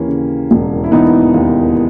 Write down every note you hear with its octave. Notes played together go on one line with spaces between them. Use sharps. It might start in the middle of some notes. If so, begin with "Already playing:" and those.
Already playing: D#2 E3 A#3 C#4
C#3
E1
E4
E3 B3 D#4
D#2